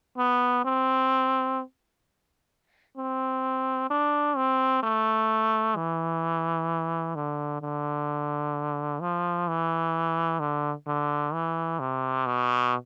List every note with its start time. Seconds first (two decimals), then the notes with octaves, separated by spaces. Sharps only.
0.18 B3
0.65 C4
2.97 C4
3.90 D4
4.37 C4
4.83 A3
5.76 E3
7.15 D3
7.61 D3
9.01 F3
9.48 E3
10.40 D3
10.87 D3
11.33 E3
11.80 C3
12.26 B2